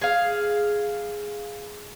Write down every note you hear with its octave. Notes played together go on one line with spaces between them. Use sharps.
G#4 F5